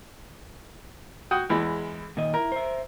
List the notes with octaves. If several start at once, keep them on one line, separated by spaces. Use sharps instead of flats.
F#4 G5 D#6
E2 E3 G#3
A#2 D#3 D#5
E4 A#4
C5 E5